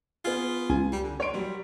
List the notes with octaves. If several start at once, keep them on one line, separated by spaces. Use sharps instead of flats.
B3 F4 G#4
C#2 G#5
G3
D3
A#3 C#5 C6 D7
F#3 G3